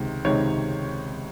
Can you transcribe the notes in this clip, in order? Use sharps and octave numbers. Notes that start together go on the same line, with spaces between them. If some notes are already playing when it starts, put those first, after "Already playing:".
Already playing: C#2 C3 D#3
C#2 C3 D#3 C#5